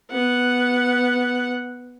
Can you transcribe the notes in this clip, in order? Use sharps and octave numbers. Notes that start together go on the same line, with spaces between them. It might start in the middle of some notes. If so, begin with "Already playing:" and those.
B3 F#5